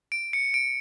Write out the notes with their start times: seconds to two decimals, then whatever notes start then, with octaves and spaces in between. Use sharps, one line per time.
0.12 D7
0.33 C#7
0.54 D7